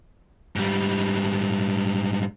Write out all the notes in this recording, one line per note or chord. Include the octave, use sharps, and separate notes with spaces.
G#2 G3